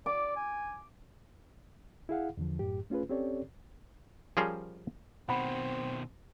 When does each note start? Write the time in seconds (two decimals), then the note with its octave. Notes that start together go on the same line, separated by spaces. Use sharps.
0.06 D5 D6
0.36 G#5
2.09 E4 G#4 F5 F#5
2.37 E2 D3 F3
2.59 F#2 A2 G4
2.90 A3 C#4 F4 G#4 B4
3.09 C4 C#4 G4 A4 C#5 D5
4.37 F3 G3 C#4 G#4 A#4 C5
5.29 B2 D#3 C4 F#5 B5